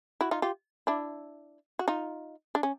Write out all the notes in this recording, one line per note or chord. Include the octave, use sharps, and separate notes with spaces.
E4 F#4
D#4 F4
F4 G4
D4 E4
F#4
D#4 F4
D4
C#4